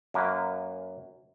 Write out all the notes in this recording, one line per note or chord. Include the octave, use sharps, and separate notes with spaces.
F#2 A#3 B4